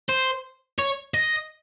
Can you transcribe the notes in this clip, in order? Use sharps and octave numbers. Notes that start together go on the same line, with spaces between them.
C5
C#5
D#5